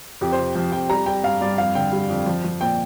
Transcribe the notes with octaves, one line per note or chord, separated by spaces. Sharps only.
F2 G4
C5
C3
F3 G5
F2 G5
G3 A#5
G3 G5
G2 F5
G2 D5
F2 F5
D3 G5
G3
F2
F3
F3
A#2 G5